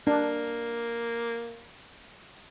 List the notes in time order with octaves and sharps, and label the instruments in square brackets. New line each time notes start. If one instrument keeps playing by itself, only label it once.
[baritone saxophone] A#3 [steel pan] D4